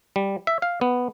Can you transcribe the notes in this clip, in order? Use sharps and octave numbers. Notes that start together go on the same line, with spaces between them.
G3
E5
F5
B3